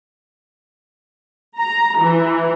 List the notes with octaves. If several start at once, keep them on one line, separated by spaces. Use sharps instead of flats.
A#5
E3